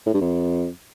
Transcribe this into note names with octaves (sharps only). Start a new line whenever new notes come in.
A2
G2
F2